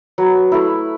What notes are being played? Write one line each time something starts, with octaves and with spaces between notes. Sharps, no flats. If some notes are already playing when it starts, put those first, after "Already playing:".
F#3 B4
A3 E4